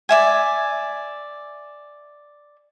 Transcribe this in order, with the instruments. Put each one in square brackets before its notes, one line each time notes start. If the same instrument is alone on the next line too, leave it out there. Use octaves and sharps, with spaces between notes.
[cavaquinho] D5 E5 G#5